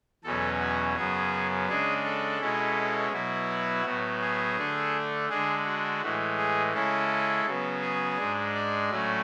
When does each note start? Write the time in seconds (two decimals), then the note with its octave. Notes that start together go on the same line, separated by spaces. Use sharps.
0.24 E2 B2 F#3 C#4 A4
0.60 F#4
0.96 F#2 C#3 F#3 B3 G#4
1.68 C#3 G#3 D4 G#4
2.04 A4
2.40 B2 G#3 C#4 E4
3.12 B2 F#3 B3 E4
3.49 F#4
3.85 A2 F#3 B3
4.21 G#4
4.57 D3 A3 D4
5.29 D3 G#3 D4 G#4
5.65 F#4
6.02 A2 E3 G#3
6.38 G#4
6.74 C#3 G#3 C#4 E4 A4
7.46 C#3 F#3 B3
7.82 G#4
8.18 G#2 G#3 D4
8.54 D5
8.90 A2 F#3 A3 C#4